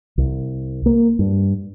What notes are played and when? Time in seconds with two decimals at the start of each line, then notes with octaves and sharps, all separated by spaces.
0.18 C2
0.86 A#3
1.19 G2